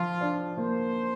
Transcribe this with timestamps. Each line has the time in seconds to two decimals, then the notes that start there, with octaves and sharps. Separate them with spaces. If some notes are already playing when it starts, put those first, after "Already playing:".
Already playing: F3 F4
0.21 D4
0.57 A#3 C5